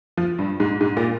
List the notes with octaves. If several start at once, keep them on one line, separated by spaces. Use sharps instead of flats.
F3
G2
G#2
G#2
A#2